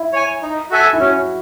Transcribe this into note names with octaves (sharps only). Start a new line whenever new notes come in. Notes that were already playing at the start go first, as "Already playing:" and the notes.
Already playing: E4
C#5 G#5
D#4
F#4 A4 E5 G#5
E4
C#4 F#4